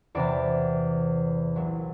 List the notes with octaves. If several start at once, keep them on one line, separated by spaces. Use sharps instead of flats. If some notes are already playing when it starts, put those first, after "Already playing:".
E2 C3 E3 D5
C2 A#2 F#3